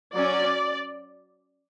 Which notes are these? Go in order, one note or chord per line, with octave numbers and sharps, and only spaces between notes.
F#3 C#4 D5